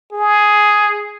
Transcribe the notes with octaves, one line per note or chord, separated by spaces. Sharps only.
G#4